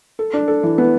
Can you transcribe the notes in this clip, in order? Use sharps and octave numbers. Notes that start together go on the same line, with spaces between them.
A4
D4
A4
E3
B3